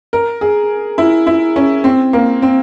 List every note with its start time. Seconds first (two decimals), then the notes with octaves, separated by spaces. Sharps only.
0.13 A#4
0.41 G#4
0.98 E4
1.27 E4
1.56 C#4
1.84 C4
2.13 A#3
2.42 C4